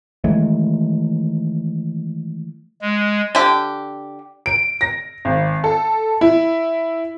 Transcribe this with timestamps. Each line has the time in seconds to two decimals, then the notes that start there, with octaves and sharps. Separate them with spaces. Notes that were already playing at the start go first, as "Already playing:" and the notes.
0.24 D#3 E3 G#3 A3
2.82 G#3
3.35 D3 G4
4.46 D7
4.81 A#6
5.25 G#1
5.64 A4
6.21 E4